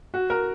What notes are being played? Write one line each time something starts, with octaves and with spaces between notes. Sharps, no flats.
F#4
A#4